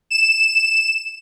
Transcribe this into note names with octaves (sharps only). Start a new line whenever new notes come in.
E7